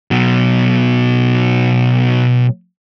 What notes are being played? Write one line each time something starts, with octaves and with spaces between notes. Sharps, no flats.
B2 F#3